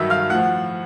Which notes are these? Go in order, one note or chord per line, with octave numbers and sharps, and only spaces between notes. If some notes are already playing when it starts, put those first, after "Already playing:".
Already playing: G2 D#3 F#3 E5 E6
F5 F6
A2 F3 F#5 F#6